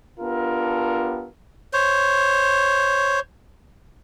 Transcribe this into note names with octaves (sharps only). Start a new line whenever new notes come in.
B3 D4 F4 G4 A4 A#4
C5 C#5